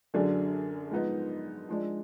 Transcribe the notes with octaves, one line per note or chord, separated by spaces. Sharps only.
F#2 D3 F#3 D4 G#4
G#2 F3 B3 D#4
F3 G#3 D4